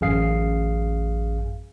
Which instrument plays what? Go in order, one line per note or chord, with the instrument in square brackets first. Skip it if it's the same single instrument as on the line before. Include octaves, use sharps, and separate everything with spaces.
[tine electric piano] A1 F#2 G#4 F5 C7